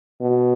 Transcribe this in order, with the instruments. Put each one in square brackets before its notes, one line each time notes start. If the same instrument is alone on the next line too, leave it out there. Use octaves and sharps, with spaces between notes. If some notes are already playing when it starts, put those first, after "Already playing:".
[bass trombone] B2